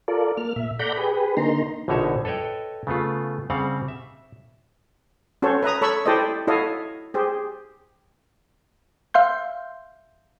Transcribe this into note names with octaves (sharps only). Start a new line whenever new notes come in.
F4 A4 A#4 D5
A#3 F6
A#2 E5
A4 D5 F#5 A#5 B5 G6
G4 G#4 B4
D3 A#3 D#4 A#5 C6
A#1 B2 D3 D#4 C#5 E5
A4 B4 C#5 D#5 G5
C#3 A3 B3 F4
C#3 G3 C4 F5 F#5
E5
C#4 F#4 A4 C5 C#5
B4 E5 A#5 D#6
A4 C#5 B5 C#6 E6
E4 G4 A4 C5 D5 D#5
E4 F#4 A4 C#5 D#5 F5
G4 G#4 C5
E5 F5 C6 G6